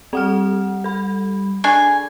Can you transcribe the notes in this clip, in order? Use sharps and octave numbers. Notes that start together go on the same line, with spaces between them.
G3 C4 F#5 F6
A4 B5
D4 G#4 G#5 C#6